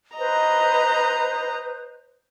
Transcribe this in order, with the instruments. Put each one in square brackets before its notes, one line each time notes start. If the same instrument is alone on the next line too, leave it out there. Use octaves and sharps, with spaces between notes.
[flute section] B4 C5 [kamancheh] D#5 A#5